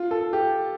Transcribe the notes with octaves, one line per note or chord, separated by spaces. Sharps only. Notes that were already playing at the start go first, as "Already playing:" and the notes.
Already playing: F4
A4
G4